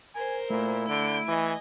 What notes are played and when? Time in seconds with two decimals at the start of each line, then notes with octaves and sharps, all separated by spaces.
0.15 A#4 C5 G#5
0.50 A#2 A3 E4
0.88 D3 G6 D7
1.28 E3 D#5 G#5